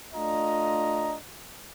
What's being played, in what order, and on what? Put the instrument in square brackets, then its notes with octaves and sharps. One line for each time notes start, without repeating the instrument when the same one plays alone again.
[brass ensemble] A3 D4 F4 D#5 A#5